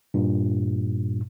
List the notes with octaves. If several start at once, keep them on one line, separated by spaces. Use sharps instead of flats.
G2 A#2